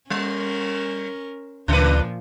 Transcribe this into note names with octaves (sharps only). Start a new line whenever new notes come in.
G3 C#4 A#4
D2 A#2 C#3 F3 D4 B4